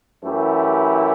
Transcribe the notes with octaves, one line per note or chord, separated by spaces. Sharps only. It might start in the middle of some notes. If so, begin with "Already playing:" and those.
F#2 E3 A3 E4 G4